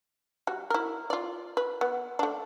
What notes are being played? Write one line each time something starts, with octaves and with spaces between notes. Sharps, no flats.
G3 F#4
E4 A#4
F4 D5
B4
B3
A3 D4